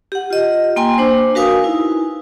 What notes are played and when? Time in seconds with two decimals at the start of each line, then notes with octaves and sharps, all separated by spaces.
0.12 G4 F#5
0.30 F4 D#5
0.76 A#3 G5 G#5 C6
0.98 D4 C5
1.35 F#4 A#4 B4 F5 G#5 D#6
1.64 D#4 E4